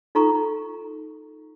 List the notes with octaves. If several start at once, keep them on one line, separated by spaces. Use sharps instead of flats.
D#4 F4 A4 A#5 C#6